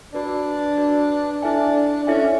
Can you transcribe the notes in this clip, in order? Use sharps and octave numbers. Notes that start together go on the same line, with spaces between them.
D4 F#4 B4 D5
F#4 B4 D5
D4 E4 A4 E5 G#5
C#4 E4 A4 E5 G#5